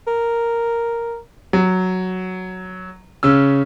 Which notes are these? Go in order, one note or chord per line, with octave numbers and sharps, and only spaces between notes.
A#4
F#3
C#3 C#4 E6